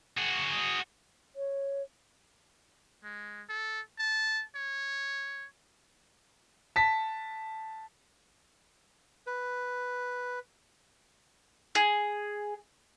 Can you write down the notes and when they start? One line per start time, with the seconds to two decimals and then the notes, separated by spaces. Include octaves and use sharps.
0.18 F#4 G#4
1.36 C#5
3.03 G#3
3.49 A4
3.99 A5
4.55 C#5
6.76 A5 B6
9.27 B4
11.75 G#4